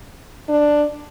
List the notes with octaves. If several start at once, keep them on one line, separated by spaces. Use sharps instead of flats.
D4